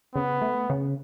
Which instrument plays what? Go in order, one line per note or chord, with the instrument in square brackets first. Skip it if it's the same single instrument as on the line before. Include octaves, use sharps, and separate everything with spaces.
[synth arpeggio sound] C#3 [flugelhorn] B3
[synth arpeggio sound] A3
C#3